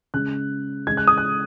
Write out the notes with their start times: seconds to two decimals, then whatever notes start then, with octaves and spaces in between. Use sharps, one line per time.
0.14 C#3 G#3 F#6
0.87 C#3 G#3 G#6
0.97 F#6
1.08 D#6
1.18 F#6